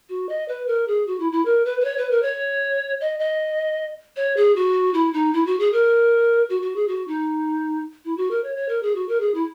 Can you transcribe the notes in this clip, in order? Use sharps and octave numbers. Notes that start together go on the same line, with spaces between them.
F#4
D#5
B4
A#4
G#4
F#4
E4
E4
A#4
B4
B4
C#5
B4
A#4
C#5
D#5
D#5
C#5
G#4
F#4
E4
D#4
E4
F#4
G#4
A#4
F#4
F#4
G#4
F#4
D#4
E4
F#4
A#4
C#5
C#5
A#4
G#4
F#4
A#4
G#4
E4